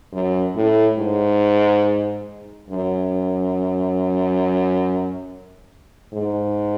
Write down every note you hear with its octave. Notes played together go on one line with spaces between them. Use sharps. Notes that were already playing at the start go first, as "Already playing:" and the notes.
F#2
A2
G#2
F#2
G#2